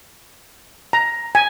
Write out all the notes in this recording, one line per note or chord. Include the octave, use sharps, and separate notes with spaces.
A#5
G#5